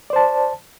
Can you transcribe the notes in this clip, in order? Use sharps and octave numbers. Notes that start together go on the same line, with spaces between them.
C5 D5 A5